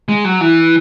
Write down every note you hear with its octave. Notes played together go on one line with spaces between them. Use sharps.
G#3
F#3
E3